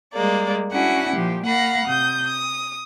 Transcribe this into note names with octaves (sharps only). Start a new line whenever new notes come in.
G3 G#3 A#3 D5
C#4 D4 E4 F#4 F#5
A#2 F3 G4
A#3 F5 F#5 B5 A#6
C3 D#6 G6
D#6